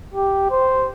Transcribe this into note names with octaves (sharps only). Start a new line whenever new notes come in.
G4
C5